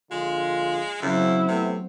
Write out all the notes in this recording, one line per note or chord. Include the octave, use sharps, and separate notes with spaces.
A#1 D3 G#3 F4
F#2 C#3 F#3 C4 E4
C3 E3 A3 B3